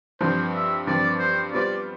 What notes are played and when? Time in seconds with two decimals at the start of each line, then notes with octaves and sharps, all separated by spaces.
0.21 G2 F3 C4 C5
0.54 E5
0.87 G2 F3 C4 D5
1.19 C5
1.52 G3 B3 F4 C5 D5